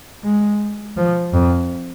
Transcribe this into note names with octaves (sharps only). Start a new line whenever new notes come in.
G#3
F3
F2